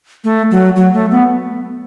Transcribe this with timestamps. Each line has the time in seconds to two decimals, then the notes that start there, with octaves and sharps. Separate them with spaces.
0.24 A3
0.51 F#3
0.76 F#3
0.94 A3
1.11 B3